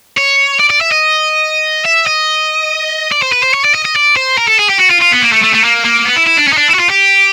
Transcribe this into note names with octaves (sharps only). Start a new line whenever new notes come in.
C#5
D5
D5
E5
D#5
E5
D#5
D5
C5
B4
C5
C#5
D5
D#5
D#5
D5
C5
A#4
A4
G#4
G4
F#4
F4
F4
B3
A#3
A3
A3
A3
A#3
A#3
B3
E4
E4
D4
C#4
D#4
D4
E4
F#4
F4
G4